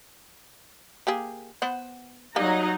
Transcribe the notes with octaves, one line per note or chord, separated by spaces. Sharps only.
A#3 G4 G#4
B3 C5 F#5
F#3 G3 A#3 D#4 A#5